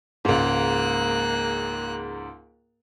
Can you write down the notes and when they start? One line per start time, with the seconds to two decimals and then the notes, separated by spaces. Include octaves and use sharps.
0.25 C#2 G#2 A#3 F#6